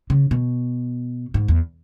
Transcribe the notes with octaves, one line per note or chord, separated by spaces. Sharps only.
C#3
B2
G#2
E2